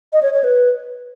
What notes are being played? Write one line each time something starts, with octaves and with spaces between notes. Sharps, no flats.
D#5
C#5
C#5
B4